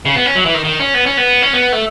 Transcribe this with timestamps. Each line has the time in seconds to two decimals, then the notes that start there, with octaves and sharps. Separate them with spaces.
0.05 C#3
0.16 B3
0.26 C#4
0.35 F#3
0.45 E3
0.54 D#3
0.65 D#3
0.80 C#4
0.94 B3
1.06 C#4
1.17 B3
1.42 C#4
1.53 B3
1.73 A3